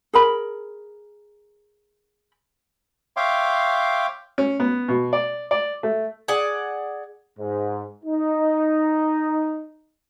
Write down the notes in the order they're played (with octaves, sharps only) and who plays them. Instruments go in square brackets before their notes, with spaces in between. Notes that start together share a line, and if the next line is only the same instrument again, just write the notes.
[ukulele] G#4 A#4 B5
[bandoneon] C#5 E5 F5 G5 C6 D6
[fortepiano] C#4
B3
B2
D5
D5
A3
[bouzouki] G#4 D5 F#5
[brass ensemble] G#2
D#4